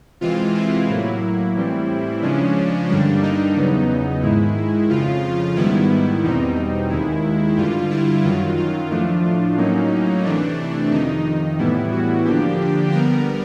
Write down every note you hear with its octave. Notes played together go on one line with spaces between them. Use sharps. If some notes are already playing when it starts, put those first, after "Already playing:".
C3 E3 G#3 C4 F4
E4
A2 F#3 A#3
A2 E3 G3 C4
C#3 F3 G#3 C#4 D4
G2 D3 G3 A#3 D4
D#4
E2 C#3 F#3 B3
G#2 D#3 G#3 E4
F2 C#3 F3 F4
G#2 D#3 G3 B3 E4
E2 B2 G3 C4 D#4
D#2 D#3 G#3 E4
G2 D3 G3 F4
E4
F#2 D#3 F#3 F4
F4
A2 F3 A3 D4 F4
F4
A2 F#3 A#3 C#4 D#4
C3 E3 A3 D4
F2 C3 D#3 D#4
A2 E3 G3 B3 E4
F#4
D3 F3 A#3 D4 G4
D3 G3 B3 A#4